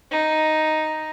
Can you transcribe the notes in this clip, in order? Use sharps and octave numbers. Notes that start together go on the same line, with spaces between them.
D#4